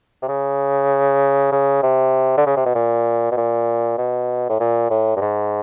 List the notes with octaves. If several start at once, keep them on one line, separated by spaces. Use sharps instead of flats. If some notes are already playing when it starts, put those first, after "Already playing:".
C3
C#3
C#3
C3
D3
C#3
C3
B2
A#2
B2
A#2
B2
A2
A#2
A2
G2
G#2